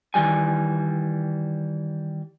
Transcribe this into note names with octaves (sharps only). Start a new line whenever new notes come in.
D#3 E3 G3 G#5